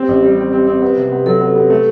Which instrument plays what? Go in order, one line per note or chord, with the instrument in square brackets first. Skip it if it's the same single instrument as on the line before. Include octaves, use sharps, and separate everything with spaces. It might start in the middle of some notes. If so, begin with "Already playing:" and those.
Already playing: [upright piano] C4 [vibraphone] G4
[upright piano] A1
G3
C4
C4
C4
B3
C3
B3
[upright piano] F#3 [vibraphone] A4
[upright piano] B3
B3
A3